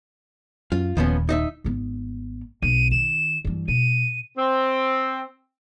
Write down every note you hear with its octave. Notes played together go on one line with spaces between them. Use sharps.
F#2 F4
D#1 D#2 F3 B3 C#4
D#4 D#5 E5
G#1 B3
B1 D#7
D#3 E7
G2 E3
B2 D#7
C4